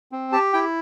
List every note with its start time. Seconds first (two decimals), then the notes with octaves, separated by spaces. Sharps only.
0.12 C4
0.32 G4 A5
0.53 E4 G5